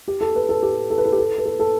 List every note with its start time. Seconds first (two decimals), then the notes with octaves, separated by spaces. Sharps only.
0.08 G4
0.21 A4
0.35 B4
0.49 A4
0.63 G4
0.90 A4
0.98 B4
1.05 A4
1.12 G4
1.18 A4
1.38 B4
1.46 A4
1.59 A4